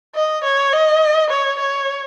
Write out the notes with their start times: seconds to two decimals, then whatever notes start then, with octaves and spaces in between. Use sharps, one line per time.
0.15 D#5
0.44 C#5
0.73 D#5
1.30 C#5
1.59 C#5